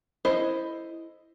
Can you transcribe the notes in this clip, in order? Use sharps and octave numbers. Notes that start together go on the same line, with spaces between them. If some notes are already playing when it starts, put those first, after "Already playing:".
E4 A4 C5 D#5